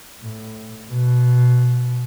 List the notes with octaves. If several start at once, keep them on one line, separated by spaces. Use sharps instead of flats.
A2
B2